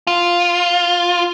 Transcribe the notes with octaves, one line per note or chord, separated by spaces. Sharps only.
F4